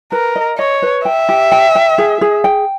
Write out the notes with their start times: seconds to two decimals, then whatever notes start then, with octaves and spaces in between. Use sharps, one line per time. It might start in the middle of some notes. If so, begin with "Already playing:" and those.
0.12 A#4 B4
0.36 D#5
0.58 C#5 D#5
0.82 B4
1.05 E5 G5
1.29 G4
1.52 G5
1.75 G5
1.98 G#4
2.21 G#4
2.44 G5